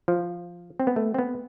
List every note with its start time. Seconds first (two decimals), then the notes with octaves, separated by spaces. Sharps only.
0.08 F3
0.80 C4
0.87 B3
0.96 A3
1.14 C4
1.18 B3